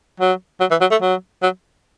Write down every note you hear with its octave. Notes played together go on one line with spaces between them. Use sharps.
F#3
F#3
E3
F#3
A3
F#3
F#3